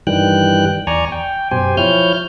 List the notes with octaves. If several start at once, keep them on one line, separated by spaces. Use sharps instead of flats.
G2 D#3 E3 G3 G5 F#6
E2 D5 G#5 A#5 C#6
G5
F#2 B2 G4 C5 G#5
F3 E4 C#5 F6 G6